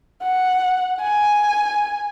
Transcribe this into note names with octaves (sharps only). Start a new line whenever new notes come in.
F#5
G#5